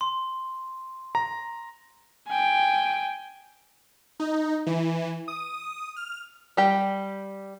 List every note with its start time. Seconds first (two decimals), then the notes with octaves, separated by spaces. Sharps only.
0.01 C6
1.15 A#5
2.28 G5 G#5
4.20 D#4
4.67 E3
5.28 D#6
5.96 F6
6.57 G3 G4